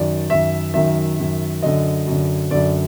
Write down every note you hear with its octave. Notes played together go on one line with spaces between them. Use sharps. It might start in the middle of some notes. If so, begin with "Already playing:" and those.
Already playing: F#2 D#3 D5
F#2 D#3 E5
F#2 D#3 E5
F#2 D#3
F#2 D3 D#5
F#2 D3
F#2 D3 D5